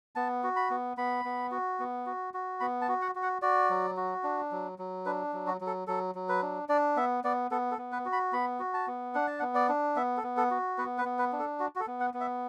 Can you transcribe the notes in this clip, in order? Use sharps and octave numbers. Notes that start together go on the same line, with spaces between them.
B3 A5
F#4
B5
B3
B3 B5
B3
F#4
B3
F#4
F#4
B3 B5
A5
F#4
F#5
F#4
F#5
F#4 D5
F#3
F#4
D4
F#3
F#3
D4 B4
F#3
F#4
F#3
A4
F#3 A4
F#3
B4
D4
D4 D5
B3 E5
B3 D5
B3 A4
A4
B3
B4
F#4
B5
B3 B5
F#4
A5
B3
D4 F#5
A5
F#5
B3
D5
D4
B3 E5
A4
B3
A4
F#4
B3 B4
B4
B3
B4
D4
A4
F#4
F#4
A4
B3
F#5
B3
E5